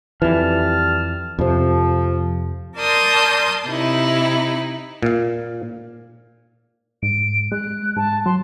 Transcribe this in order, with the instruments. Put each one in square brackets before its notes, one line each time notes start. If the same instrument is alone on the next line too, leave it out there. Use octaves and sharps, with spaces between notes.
[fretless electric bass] F2 E3 [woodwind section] G3 A5 F6
[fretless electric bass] F2 C3 [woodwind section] F3
[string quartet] A#4 D5 A5 C6 D#6 G6
C3 D#4 E4
[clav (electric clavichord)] A#2 F5
[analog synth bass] G#2 [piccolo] D7
[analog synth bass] G#3 [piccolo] F#6
[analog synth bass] G#2 [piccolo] A5
[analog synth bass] F#3 [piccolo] C6